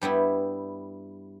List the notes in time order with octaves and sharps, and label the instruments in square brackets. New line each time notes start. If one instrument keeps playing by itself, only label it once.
[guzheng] G2 G3 B3 E4